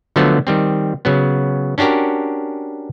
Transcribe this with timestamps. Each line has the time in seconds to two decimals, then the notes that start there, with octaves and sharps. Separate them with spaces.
0.16 D3 F3 F#3 A3 B3
0.47 D#3 G3 C4
1.05 C#3 F#3 B3
1.78 C#4 D4 F#4 G4 A#4